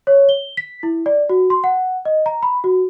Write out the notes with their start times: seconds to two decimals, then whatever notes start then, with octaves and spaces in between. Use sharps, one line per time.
0.07 C#5
0.29 G7
0.57 B6
0.83 E4
1.06 D5
1.29 F#4
1.50 C6
1.64 F#5
2.05 D#5
2.26 A#5
2.43 B5
2.64 F#4